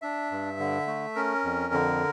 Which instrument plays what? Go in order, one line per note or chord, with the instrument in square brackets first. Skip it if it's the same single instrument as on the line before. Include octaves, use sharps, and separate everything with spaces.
[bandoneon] D4 E5
G2
D3
A3
C#4 A#4
F2
D3